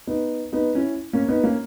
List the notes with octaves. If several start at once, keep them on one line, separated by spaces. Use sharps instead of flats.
B3 D#4
B3 D#4
C#4 E4
A#3 C#4
B3 D#4
A#3 C#4